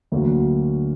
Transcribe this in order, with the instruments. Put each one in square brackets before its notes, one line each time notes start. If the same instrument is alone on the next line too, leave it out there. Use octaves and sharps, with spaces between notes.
[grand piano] D2 D3 F#3 A#3